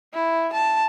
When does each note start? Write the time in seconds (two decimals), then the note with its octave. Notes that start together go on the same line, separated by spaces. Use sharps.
0.13 E4
0.53 A5